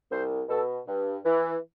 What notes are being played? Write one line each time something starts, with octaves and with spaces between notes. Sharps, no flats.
C2 C5
B2 A4
G2
E3